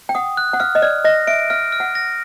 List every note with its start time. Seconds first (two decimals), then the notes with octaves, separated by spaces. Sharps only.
0.09 G5
0.15 F#5 D#6
0.37 F#6
0.53 F#5
0.60 F5 F6
0.75 D#5
0.82 D5 F6
1.05 D#5 A#6
1.27 E5 D7
1.50 F5 F6
1.72 F6
1.80 F#5
1.95 A#6